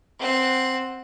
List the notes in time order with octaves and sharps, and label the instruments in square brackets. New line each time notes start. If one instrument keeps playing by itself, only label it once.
[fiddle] C4 F#5